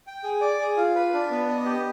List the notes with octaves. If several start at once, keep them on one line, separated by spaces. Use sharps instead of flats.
G5
G#4
D5
G#4
F4
B4
D4
B3
D#5
G4